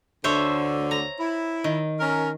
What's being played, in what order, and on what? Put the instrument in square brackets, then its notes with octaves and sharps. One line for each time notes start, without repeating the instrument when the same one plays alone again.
[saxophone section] D2 D3 [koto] C5 C#5 E5
[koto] A#5
[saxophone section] E4
[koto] D#3
[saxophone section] C#4 A#4